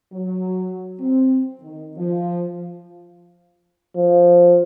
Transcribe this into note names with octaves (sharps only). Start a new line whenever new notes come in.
F#3
C4
D#3
F3
F3